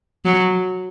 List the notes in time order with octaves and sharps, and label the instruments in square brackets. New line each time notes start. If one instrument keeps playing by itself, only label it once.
[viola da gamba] F#3